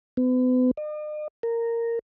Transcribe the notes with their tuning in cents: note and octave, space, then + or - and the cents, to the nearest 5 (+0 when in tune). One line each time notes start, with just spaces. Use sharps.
B3 +40
D#5 -45
A#4 -10